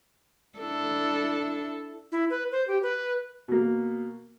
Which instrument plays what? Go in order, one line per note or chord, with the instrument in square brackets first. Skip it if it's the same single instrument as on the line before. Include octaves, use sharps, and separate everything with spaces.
[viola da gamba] D4 E4 A4
[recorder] E4
B4
C5
G4
B4
[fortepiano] B2 A#3